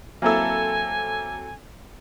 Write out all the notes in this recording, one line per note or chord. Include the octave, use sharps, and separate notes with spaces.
F#3 A#3 C4 E4 A4 G#5 E6